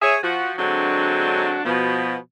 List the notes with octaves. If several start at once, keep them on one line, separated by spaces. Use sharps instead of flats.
G#4 C#5 E5
F3 F#4
D3 F#3 G#3 C4 D4 F#4
B2 F3 B3